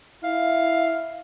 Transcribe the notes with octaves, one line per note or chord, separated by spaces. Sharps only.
E4 F5